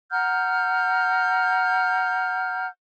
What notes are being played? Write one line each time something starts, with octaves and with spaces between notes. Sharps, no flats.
F#5 A#5 F6 G6